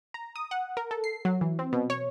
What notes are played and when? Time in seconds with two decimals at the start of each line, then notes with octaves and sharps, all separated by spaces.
0.14 A#5
0.36 D#6
0.51 F#5
0.77 A#4
0.91 A4
1.04 C7
1.25 F#3
1.41 E3
1.59 C4
1.73 B2
1.90 C#5